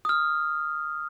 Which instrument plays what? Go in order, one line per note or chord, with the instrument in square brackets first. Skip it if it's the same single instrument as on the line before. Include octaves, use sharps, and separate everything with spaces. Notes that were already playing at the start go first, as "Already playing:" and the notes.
[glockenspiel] D#6 F6